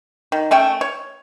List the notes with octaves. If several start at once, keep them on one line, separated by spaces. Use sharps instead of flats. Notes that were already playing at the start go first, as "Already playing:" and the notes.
D#3
A3 C#4 E5 G5
C#5